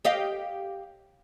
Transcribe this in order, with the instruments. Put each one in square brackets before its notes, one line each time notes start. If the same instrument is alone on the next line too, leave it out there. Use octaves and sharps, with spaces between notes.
[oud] G4 D#5 F5